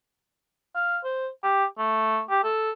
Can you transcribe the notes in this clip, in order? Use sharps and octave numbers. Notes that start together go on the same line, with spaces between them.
F5
C5
G4
A3
G4
A4